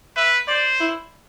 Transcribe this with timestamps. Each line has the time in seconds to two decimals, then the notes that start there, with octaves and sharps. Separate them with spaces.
0.16 B4 E5
0.48 C5 D5
0.80 E4